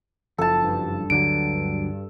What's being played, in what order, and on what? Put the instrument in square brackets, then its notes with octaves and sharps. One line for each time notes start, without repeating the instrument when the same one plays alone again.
[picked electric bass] F#1 F3 [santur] A4 A5
[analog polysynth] G2
[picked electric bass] D2 D3 F#3 [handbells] D7